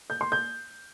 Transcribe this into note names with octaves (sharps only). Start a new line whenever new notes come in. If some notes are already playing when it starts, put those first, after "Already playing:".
G6
C6
G6